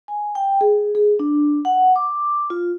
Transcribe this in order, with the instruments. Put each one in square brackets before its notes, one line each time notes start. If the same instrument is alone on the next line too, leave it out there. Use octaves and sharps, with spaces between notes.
[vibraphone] G#5
G5
G#4
G#4
D4
F#5
D6
F4